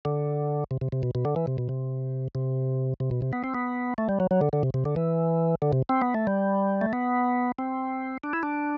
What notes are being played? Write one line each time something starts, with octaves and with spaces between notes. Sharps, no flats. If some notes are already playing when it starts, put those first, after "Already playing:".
D3
C3
C3
C3
B2
B2
D3
E3
C3
B2
C3
C3
C3
B2
C3
B3
C4
B3
A3
G3
F#3
F#3
D3
D3
C3
C3
D3
E3
D3
C3
C4
B3
A3
G3
A3
B3
C4
D4
E4
D4